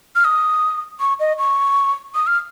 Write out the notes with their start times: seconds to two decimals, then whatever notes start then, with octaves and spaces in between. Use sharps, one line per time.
0.16 F6
0.25 D#6
1.00 C#6
1.20 D#5
1.38 C#6
2.15 D#6
2.27 F6